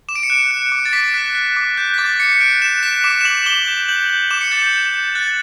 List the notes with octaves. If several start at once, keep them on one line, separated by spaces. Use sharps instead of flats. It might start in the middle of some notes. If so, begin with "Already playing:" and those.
D6 E7
D7
C#7
F#6 D7
F#6 C#7
D6
A6
D6 B6
F#6
F#6
D6
F#6 G6
B6
D6 A6
D6 C#7
F#6 D7
F#6 E7
F#6 B6
D6 E7
E7
D6 F#7
D6 G7
G6
G6 F#7
G6
D6 E7
C#7
G6 A6
G6
G6
G6
F#6 A6